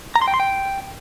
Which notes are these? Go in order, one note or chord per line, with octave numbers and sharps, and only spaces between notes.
A#5
C6
G5
C6
G5